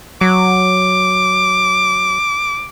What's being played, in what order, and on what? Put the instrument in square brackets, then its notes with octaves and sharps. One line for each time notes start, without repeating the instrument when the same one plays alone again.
[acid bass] F#3 [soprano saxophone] D6